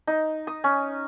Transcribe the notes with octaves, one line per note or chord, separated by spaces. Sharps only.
D#4
D#6
C#4